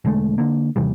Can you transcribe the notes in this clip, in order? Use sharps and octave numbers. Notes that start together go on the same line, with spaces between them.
E1 D3 G#3 A3
D3 A#3
D#2 C3 E3 G3